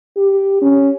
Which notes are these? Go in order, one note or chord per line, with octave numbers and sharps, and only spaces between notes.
G4
C#4